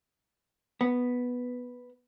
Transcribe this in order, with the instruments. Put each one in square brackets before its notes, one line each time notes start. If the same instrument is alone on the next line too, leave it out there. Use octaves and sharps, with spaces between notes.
[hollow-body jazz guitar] B3